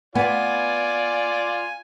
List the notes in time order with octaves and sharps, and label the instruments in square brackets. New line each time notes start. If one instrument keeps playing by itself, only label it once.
[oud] B3 [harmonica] F4 D5 [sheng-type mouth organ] G#5